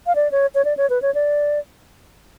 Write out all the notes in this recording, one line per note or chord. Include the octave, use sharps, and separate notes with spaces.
F5
D5
C#5
C#5
D5
C#5
B4
C#5
D5